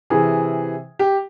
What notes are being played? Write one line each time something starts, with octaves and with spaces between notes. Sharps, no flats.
C3 E3 G#4
G4